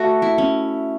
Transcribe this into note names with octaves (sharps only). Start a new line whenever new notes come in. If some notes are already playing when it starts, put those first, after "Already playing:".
Already playing: A3 F#4
E4
C#4